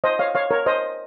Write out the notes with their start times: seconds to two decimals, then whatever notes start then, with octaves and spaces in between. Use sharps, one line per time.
0.04 C5 D#5
0.19 C#5 F5
0.35 C#5 F5
0.51 A#4 C#5
0.66 C5 D#5